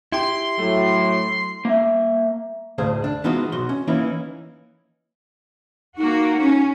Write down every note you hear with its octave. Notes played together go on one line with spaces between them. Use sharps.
E4 G4 C6
A2 F#3 A3
A#3 E5
D2 A2 C3 G#4 C5 F5
D4
E3 G#3 B3 D#4 F4 F#4
B1 F#4 C6
C#4
E3 A#3 C#4 D#4 E4
A#3 D#4 F#4
C#4